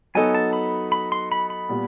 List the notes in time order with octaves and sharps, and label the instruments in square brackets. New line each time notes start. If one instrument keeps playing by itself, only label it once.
[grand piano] F#3 B3 D#4 F#4 A4 [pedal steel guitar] G#5
[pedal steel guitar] A5
B5
B5
C6
B5
B5
[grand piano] A#2 G3 B3